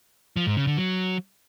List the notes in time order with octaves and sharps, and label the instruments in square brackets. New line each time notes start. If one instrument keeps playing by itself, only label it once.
[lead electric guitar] F3
G#2
C#3
D3
F#3